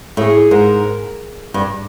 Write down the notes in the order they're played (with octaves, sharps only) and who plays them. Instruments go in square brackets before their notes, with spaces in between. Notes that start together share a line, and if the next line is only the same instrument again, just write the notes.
[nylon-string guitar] A2 [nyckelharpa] G#4
[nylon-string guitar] G#2 [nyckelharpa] A#4
[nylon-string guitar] G2